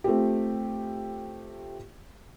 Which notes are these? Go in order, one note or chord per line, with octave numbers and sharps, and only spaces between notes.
A3 C4 F4 G4